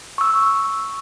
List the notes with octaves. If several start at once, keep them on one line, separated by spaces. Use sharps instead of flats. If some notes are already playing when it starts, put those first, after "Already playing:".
C#6 E6